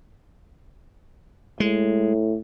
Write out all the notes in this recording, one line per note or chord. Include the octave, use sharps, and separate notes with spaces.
A2 G#3